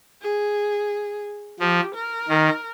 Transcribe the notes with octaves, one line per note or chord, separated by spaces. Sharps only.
G#4
F3 G4
A#4
D#3